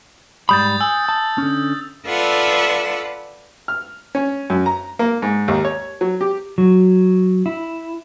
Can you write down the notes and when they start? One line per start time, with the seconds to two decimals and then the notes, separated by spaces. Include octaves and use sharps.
0.49 G#2 G3 B5 D#6 G6 A6
0.81 G#5 E6
1.09 A5
1.38 D3 C#4
2.07 F4 A4 B4 D5 E5 F#5
3.68 F6
4.15 C#4
4.50 F#2
4.66 A#5
4.99 A#3
5.22 G#2
5.48 D#2
5.65 C#5
6.01 F#3
6.21 G4
6.58 F#3
7.46 E4